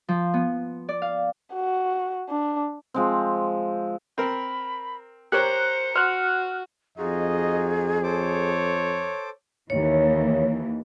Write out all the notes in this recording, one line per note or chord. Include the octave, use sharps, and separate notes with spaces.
F3
B3
D5
F5
F#4
D4
F3 G#3 C4
C4 A#4 B5
G4 A#4 C5 C#5 A#5 F#6 C#7
F#4 C5 F6 F#6
F2 D#4 F4 F#4 G#4 D#5
A4 C5 C#5 D6
D#2 E3 C#5